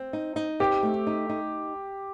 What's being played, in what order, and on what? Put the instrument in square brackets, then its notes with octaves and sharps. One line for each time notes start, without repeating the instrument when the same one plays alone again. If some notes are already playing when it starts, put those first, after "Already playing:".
Already playing: [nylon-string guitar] C4
D#4
D#4
[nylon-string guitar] C4 [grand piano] G4
[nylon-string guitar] A3
D#4
D#4